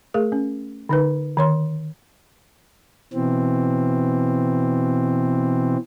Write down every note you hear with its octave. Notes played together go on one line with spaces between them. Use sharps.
A3 G#4 A#4
C#4
D3 D#4 B4
D#3 C#5 C6
B2 E3 C4